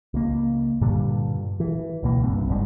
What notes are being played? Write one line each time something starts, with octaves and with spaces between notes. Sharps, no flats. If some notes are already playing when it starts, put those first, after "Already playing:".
C#2 A#3
G2 A#2 D3 G3
E3
C#2 B2 A#3
F#1 C2 G2 C4
F#1 G#2 G3 G#3